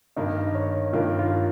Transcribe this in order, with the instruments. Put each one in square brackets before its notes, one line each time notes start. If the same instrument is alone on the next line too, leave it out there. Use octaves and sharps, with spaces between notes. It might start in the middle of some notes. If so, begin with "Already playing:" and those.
[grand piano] G2 D#3 A#3 [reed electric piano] D#5
[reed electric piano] C#5
[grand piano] G2 D#3 A#3 [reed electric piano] F4
[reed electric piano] F4